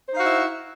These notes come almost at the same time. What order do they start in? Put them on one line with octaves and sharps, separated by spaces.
C5 D#4 F5 F#4 E4